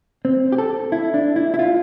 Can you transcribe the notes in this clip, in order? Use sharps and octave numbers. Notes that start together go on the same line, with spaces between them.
C4
G4
A4
E4
D4
E4
E4
F4